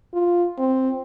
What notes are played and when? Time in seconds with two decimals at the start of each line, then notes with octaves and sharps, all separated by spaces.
0.13 F4
0.58 C4